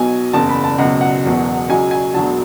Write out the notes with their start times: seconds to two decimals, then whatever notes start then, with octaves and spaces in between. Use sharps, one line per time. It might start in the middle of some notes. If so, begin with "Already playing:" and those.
Already playing: B1 B2 F#3 G#5
0.33 F#1 E2 C#3 A5
0.49 B5
0.64 A5
0.78 C#2 B2 F#3 F#5
1.01 F#5
1.24 E1 E2 B2 F#3
1.69 C#2 C#3 F#3 G#5
1.91 G#5
2.14 E1 D2 D3 F#3 A5